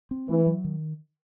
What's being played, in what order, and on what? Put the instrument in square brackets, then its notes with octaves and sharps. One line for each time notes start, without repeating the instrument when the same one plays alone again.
[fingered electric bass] C4
[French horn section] E3 [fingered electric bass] A3
[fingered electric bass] F#3
D#3